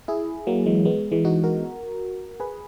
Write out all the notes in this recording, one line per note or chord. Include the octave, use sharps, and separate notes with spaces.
E4 G#4
F#3 A#3
E3 G#3
G#3 B3
E3 G#3
D#4 F#4
F#4 A#4
G#4 B4